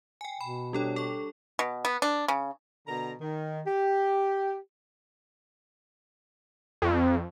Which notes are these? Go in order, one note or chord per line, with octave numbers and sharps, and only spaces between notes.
G5 G#5
B2 B5
G3 D4 G4 A4 C#5
A4 C#6
B2
B3
D4
C#3
B2 D3 A#5
D#3
G4
F2